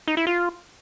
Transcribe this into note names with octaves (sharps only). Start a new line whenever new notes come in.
D#4
E4
F4